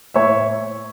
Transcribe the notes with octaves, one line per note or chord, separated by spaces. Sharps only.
A2 C#5 E5